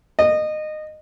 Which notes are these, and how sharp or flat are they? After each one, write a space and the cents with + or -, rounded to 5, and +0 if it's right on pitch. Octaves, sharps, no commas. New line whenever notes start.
D#5 -20